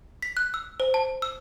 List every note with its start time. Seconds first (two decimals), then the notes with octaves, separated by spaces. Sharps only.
0.22 B6
0.37 F#6
0.54 E6
0.80 C5
0.94 A5
1.22 E6